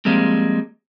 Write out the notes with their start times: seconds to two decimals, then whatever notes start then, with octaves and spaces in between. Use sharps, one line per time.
0.05 F3 G3 G#3 A#3 C4